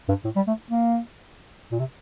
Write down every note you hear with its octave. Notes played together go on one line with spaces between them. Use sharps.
G2
A2
G3
A3
A#3
A#2
C3